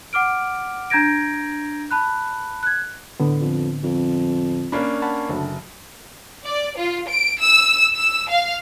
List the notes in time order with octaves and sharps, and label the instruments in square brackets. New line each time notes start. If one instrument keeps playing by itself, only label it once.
[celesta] F#5 D6 F6 D7
D4 A#5 G6 G#6 A#6 D7
A5 B5 F#6
F#6 G#6
[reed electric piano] A2 D3 B3
[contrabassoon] F2
F2
[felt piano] A#3 C#4 D4 [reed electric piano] B5
[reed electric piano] F#5 A5 B5
[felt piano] F#1 [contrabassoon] D2
[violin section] D5
F4
D7
E6
E6
F5